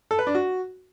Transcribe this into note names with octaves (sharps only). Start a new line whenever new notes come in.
A4
B4
D4
F#4